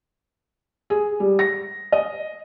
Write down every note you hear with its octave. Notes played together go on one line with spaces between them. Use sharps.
G#4
G3
A#6
D#5